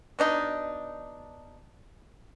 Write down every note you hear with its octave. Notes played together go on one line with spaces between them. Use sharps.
B2 D4 D#4